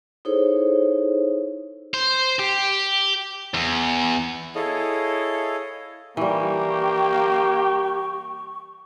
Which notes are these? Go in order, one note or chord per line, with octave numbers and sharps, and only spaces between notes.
D#4 E4 G#4 A4 C5 C#5
C5
G4
E2
E4 G#4 A4 C#5 D#5 F5
E3 G3 A#3 G4 C#6